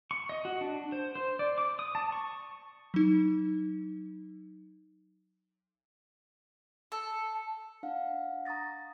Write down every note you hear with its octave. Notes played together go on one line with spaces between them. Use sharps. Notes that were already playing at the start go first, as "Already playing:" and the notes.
C#6
D#5
F#4
D4
C5
C5
D5
D6
D#6
A5
C#6
F#3 D#4
A4
D4 F5 F#5
A#5 C#6 D#6 A6 A#6